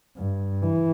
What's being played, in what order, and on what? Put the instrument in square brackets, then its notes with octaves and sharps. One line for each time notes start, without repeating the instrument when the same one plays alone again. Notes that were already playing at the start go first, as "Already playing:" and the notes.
[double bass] G2
E3